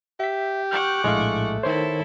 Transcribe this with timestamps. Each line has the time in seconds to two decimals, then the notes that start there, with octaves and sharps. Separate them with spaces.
0.20 G4 E5 B6
0.71 F#5 C#6 D6 F6 G6
1.04 A#1 A2 G#3 A3 F5
1.63 D#3 E4 A4 C5 C#5